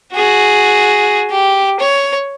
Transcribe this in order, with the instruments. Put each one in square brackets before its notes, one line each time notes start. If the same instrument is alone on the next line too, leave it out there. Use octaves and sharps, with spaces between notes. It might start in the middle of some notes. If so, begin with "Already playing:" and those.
[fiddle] F#4 G#4
G4
C#5